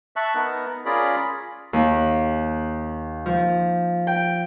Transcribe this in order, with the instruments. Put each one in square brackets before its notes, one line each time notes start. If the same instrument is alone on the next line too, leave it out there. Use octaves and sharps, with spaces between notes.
[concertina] E5 A5 C#6 F#6
B3 D#4 A#4
C#4 F4 G#4 A#4 D5 B5
[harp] D#2
F3
G5